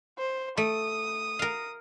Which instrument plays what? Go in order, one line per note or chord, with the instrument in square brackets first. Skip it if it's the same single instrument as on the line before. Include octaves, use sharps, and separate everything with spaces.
[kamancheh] C5
[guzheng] A3 [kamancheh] D#6
[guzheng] A#4 F5